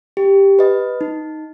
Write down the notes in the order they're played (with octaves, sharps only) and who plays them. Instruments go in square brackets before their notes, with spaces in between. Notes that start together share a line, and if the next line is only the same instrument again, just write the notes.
[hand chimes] G4
B4 D#5
D#4